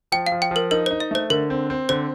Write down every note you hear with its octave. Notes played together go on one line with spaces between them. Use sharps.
F3 G5
F5
F3
G5
F3 A#4
D#4 A#4
D#4 C5
D#5
A3 C5
D3 A#4
C4
C4
D3 C5